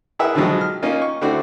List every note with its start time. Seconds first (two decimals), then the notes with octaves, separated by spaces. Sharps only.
0.19 E4 G#4 A#4 B4 E5 F#5
0.35 B2 D3 D#3 F3 F#3 G#3
0.61 F6
0.82 A#3 C#4 D#4 F4
1.02 C#6
1.21 D3 A3 C4 E4 F#4 D5